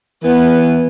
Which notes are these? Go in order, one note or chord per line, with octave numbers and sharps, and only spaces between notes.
E3 B3